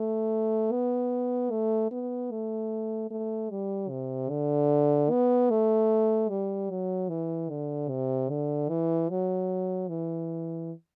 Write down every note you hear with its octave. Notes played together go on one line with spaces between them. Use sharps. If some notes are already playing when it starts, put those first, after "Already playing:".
Already playing: A3
B3
A3
B3
A3
A3
G3
C3
D3
B3
A3
G3
F#3
E3
D3
C3
D3
E3
F#3
E3